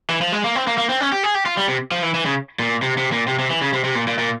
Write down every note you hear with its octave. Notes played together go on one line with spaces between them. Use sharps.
E3
F3
G#3
A#3
C4
A#3
A#3
C4
C#4
G4
G#4
G4
F4
G3
C3
F3
E3
E3
C#3
A#2
C3
C3
A#2
C3
C3
E3
C#3
C3
C3
A#2
A#2
A#2